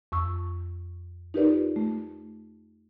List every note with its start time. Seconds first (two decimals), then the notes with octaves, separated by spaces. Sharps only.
0.12 F2 C#6 E6
1.34 D#4 F4 G4 A#4 B4 D5
1.76 A3